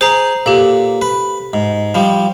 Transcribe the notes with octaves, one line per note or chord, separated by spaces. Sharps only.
G#4 C5 A#5
A#2 G4 A4
B4
G#2
F3 G3